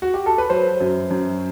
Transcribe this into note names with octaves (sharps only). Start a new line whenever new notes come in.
F#4
G4
A4
B4
F#3 C5
F#2
F#2